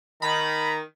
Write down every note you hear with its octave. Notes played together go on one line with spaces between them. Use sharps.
D#3 A#5 B5